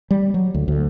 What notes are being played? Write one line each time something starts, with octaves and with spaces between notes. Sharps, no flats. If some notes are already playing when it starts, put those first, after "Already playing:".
G3
F#3
D2
D2